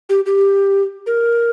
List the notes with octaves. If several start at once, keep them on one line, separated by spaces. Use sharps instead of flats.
G4
G4
A#4